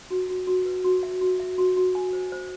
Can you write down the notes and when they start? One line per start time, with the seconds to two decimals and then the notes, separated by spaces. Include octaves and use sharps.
0.10 F#4
0.29 F#4
0.47 F#4
0.65 B4
0.84 F#4
1.03 E5
1.21 F#4
1.40 E5
1.58 F#4
1.76 F#4
1.95 G#5
2.13 C5
2.32 C5